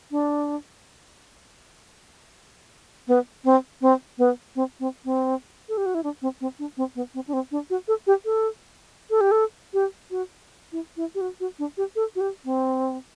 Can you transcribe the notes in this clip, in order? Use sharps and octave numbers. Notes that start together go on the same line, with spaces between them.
D4
B3
C4
C4
B3
C4
C4
C4
A4
G4
F#4
E4
D4
C4
C4
D4
C4
B3
C4
D4
C4
D4
F#4
A4
G4
A4
A4
G4
A4
G4
F#4
E4
E4
G4
F#4
F#4
D4
G4
A4
F#4
G4
C4